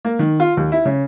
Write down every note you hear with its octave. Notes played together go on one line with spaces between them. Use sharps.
A#3
D#3
F4
D#2
E4
C#3